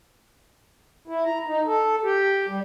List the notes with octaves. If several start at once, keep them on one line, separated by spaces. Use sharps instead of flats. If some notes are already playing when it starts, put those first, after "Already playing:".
E4
A#5
D#4
A4
G4
G3